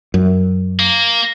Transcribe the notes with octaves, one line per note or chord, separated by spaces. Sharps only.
F#2
A#3